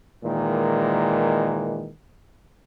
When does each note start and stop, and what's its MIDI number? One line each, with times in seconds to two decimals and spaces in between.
0.24 1.90 46
0.24 1.90 51
0.24 1.90 52
0.24 1.90 56